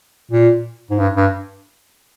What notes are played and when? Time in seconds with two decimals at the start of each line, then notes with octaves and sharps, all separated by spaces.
0.31 A#2
0.90 G#2
0.99 G2
1.16 G2